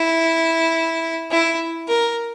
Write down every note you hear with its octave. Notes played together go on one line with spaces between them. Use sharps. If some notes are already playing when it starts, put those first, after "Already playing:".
Already playing: E4
E4
A#4